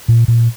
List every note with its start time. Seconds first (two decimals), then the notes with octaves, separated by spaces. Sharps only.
0.08 A#2
0.28 A#2